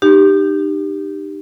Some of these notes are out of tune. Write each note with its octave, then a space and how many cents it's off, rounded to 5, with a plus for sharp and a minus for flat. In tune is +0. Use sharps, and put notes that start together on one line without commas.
D#4 -30 G4 +0